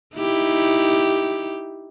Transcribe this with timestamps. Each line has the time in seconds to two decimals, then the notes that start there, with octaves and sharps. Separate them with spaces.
0.16 D#4 E4 G4